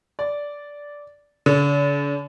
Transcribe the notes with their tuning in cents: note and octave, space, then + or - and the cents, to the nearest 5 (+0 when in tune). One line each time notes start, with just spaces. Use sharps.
D5 -10
D3 -45